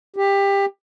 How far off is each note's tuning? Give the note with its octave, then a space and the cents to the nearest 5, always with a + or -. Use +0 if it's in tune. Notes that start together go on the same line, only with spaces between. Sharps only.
G4 +20